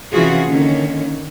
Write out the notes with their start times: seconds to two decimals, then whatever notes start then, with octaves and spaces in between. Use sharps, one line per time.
0.12 C3 E3 C#4 F4 F#4 G#4
0.49 D3 D#3 A#3 C#4